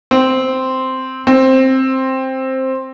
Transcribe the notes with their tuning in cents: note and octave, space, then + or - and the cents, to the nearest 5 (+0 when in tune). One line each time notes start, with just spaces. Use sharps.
C4 -5
C4 +10